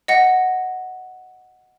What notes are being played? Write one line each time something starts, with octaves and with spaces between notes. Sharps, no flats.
D#5 F#5 A#6